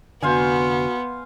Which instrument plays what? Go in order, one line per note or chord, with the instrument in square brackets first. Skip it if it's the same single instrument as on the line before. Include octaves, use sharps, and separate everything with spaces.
[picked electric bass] F1 B1 D3 [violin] B3 [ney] F#4 [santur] C5 F5 G#5